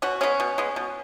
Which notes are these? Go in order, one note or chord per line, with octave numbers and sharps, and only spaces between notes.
B2 C#4 F#4
G#3 B3 C#4
B2
G#3 B3
B2